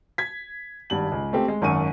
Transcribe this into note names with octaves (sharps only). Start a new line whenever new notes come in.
G#6 B6
G#1 G2 F#7
C#2
A3 C4 G4
G#3
G#1 F#2 C#6 D#7